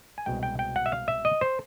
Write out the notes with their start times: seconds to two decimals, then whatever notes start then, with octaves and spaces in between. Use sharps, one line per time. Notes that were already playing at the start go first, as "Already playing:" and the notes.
0.18 G#5
0.26 C2 B2 G#3 G5
0.43 G5
0.59 G5
0.76 F#5
0.86 E5
0.92 F5
1.08 E5
1.25 D#5
1.41 C5